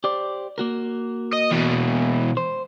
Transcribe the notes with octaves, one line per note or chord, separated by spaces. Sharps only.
G4 C5 D5
A#3 F#4 A#4
D#5
B2 E3
C5